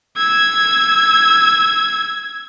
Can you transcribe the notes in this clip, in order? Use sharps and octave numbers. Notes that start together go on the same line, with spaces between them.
E6 G#6